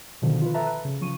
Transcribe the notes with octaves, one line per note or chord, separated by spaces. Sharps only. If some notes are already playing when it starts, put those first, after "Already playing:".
B2 D3 D#3 F3
F4 B4
A4 B4 E5 A5 A#5
B4
C#3
C#3 F3 C#6 D#7